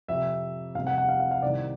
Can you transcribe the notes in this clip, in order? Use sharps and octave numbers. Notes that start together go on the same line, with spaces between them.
F2 C3 F3 E5
F1 F2 C3 F5
F#5
F#5
F5
F5
F5
C2 C3 D#3 D5